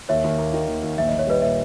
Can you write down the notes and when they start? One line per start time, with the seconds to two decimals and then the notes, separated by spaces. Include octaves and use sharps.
0.09 D#2 C#5 E5
0.24 D#2
0.39 A#3
0.53 D#3
0.68 D#2
0.83 D#2
0.98 A#1 E5
1.09 A#1 D#5
1.19 C#5
1.27 G3 B4 D#5
1.42 A#2 C#5 E5